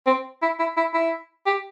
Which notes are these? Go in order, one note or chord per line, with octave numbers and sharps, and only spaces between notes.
C4
E4
E4
E4
E4
G4